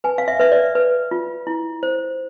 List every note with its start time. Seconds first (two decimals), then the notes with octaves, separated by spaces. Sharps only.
0.04 B4 G#5
0.18 F5
0.28 E5
0.40 B4 E5
0.52 D5
0.75 B4
1.11 F4
1.47 E4
1.83 C5